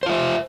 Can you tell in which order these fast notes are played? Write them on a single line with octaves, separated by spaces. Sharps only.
C5 F4 E5